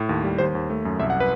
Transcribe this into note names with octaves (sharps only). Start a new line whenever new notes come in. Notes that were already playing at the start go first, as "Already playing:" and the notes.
Already playing: A2
D#2
G3
D#2 C5
D#2
A3
F#2
C2 E5
F#5
B4